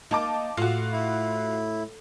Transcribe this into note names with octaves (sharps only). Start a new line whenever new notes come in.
A#3 D#4 A5 D6
A2 F4 F#4
E4